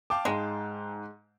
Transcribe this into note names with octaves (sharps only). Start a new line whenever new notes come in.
F5 G5 A5 D6
G#2 G#3